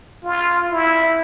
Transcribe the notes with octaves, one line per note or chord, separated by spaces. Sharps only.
F4
E4